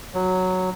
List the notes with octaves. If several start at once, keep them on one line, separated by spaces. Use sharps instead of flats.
F#3